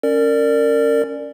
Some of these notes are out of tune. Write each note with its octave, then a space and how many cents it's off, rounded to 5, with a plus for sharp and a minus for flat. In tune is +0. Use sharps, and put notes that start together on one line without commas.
C#4 -5 A#4 -25 D5 +10